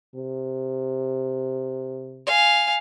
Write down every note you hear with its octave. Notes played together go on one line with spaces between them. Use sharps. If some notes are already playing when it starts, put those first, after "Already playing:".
C3
F5 G#5